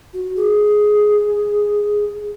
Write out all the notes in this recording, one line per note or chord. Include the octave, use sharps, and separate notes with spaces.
F#4
G#4